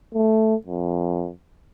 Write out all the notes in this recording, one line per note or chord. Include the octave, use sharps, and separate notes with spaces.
A3
F2